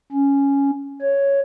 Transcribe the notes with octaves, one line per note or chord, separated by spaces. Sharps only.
C#4
C#5